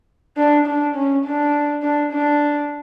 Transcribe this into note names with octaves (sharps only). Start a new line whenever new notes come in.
D4
D4
C#4
D4
D4
D4